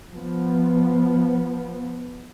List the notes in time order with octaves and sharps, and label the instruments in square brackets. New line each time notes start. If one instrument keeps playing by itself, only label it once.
[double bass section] F3 B3